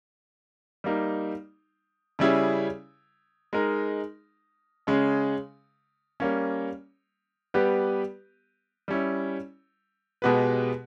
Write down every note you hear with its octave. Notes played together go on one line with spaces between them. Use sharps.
G3 A#3 D#4
C#3 G3 C#4 E4 G#4
G#3 D#4 A#4
C#3 G#3 C#4
G3 A#3 C#4
G3 B3 G4 B4
G3 C#4 E4
B2 G#3 B3 G4 B4